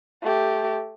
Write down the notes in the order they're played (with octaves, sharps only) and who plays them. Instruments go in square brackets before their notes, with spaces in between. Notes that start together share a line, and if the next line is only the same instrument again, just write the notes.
[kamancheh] A3 G4